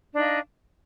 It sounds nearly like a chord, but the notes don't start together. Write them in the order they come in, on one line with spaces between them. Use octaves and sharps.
D4 D#4 F5